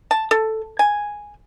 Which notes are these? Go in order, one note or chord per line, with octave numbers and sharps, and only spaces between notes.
A5
A4
G#5